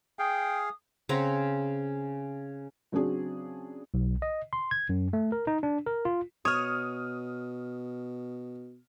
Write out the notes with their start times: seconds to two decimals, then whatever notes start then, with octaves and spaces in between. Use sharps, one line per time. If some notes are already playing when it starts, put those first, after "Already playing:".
0.19 G#4 F5 G5 D#6
1.09 C#3 C4 F#5 A#5
2.92 C#3 F#3 C4 D4 F#4 G#4
3.94 B1
4.22 D#5
4.53 C6
4.71 G#6
4.89 F#2
5.13 A3
5.32 A#4
5.47 D#4
5.63 D4
5.86 A#4
6.05 F4
6.45 B2 C#5 D#6 F6